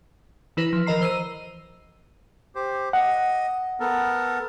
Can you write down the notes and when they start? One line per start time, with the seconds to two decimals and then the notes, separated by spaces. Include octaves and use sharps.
0.57 E3 E4 B4 A#6
0.73 F3
0.86 E3 A#4 D#5 A#5 C7
1.01 E3 C5 E6 C7 D#7
2.55 G4 C5
2.93 D#5 F#5
3.80 B3 A4 A#4